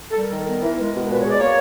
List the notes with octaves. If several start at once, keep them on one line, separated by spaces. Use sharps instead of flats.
A4
G3 A#4
D#3
B3
E3
G#3
B2
A#4
A#2 B4
C#5
G#3
D5
A#3 C#5